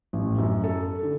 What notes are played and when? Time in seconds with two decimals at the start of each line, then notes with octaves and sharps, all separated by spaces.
0.13 A1
0.38 F#2
0.64 A4
1.03 D3